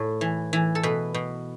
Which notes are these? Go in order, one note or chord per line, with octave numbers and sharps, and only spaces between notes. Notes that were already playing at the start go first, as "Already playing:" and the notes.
Already playing: A2
E3
E3
A4
B2 B4
B2